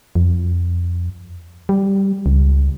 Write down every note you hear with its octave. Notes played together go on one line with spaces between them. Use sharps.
F2
G3
C#2